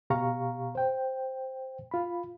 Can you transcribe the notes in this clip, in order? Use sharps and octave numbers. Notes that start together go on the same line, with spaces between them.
B2 G4 F5 A#5 C#6
C5 G5
F4 B5